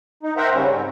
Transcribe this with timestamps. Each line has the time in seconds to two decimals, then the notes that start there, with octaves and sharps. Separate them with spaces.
0.23 D#4
0.37 A#4 C5 E5 F#5 G5 A#5
0.54 C#3 G3 C#4
0.70 G#2 C4